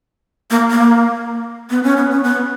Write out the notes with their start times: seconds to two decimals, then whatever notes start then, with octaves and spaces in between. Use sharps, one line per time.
0.50 A#3
0.71 A#3
1.70 B3
1.83 C#4
1.96 B3
2.10 C#4
2.23 B3